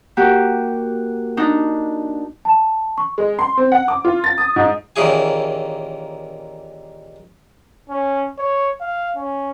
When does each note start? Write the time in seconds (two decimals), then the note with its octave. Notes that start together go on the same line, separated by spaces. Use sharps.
0.17 A#3 F#4 G4 D6
1.37 D4 D#4
2.45 A5
2.98 C#6
3.18 G#3
3.39 C6
3.57 C4
3.72 F#5
3.88 D6
4.05 F4
4.24 A6
4.38 D#6
4.56 G#2
4.96 D#2 A#2 C#3 E3 G#4 G#5
7.90 C#4
8.38 C#5
8.81 F5
9.16 C#4